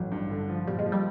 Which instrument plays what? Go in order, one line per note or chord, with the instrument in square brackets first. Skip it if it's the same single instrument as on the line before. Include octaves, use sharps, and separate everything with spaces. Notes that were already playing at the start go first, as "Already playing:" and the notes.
Already playing: [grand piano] A1 [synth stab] F#3
[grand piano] G2
D3
F3
[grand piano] A#2 [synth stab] G3
[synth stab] G#3
[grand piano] F3
[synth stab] G3